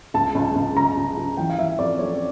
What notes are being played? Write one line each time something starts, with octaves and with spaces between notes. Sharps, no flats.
C#2 A5
C#2
C#2
C#3 A#5
C#3
C#3
E3 G5
F5
E3 E5
F2 D5
F2 C#5